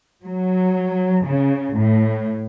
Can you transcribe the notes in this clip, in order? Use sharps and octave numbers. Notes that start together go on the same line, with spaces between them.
F#3
C#3
A2